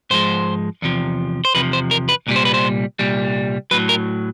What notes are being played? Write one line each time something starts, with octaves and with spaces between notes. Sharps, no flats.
G#2 F3 G#3 C5
E2 C3 F3
C5
E2 C3 F3 B4
C5
A#4
B4
C2 A#2 G3
C5
B4
C5
C2 A#2 G3
A2 F#3 B4
A#4